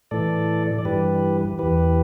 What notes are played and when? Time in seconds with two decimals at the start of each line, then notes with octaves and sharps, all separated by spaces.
0.11 A2 E3 A4 D5
0.79 D5
0.85 G2 E3 G4 B4
1.59 E2 E3 G4 B4